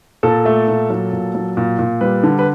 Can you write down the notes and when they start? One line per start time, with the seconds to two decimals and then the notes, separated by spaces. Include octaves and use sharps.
0.23 A#2 A4
0.45 A3
0.68 A#2
0.90 F#3
1.12 A#2
1.35 F#3
1.57 A#2
1.79 A#2
2.01 G3 B4
2.23 D3
2.39 B4